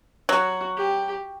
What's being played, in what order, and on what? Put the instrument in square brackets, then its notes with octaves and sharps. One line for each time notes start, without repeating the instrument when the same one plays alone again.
[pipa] F#3 [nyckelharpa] F#4
[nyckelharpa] G4